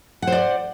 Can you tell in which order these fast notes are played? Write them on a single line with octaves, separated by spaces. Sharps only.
F#5 C5 D5